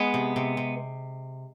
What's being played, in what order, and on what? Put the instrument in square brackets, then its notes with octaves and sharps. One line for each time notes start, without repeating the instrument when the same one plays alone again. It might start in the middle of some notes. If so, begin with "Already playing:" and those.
Already playing: [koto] G#3 [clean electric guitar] B3
[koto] C3
C3
C3